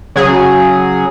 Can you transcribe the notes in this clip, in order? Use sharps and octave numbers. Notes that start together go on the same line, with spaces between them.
C#3 F#3 G#4